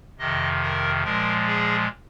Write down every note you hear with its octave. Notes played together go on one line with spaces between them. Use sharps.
F2 C3 D#3 D#5
A#4
A#2 F3 G#3 A#4
G#4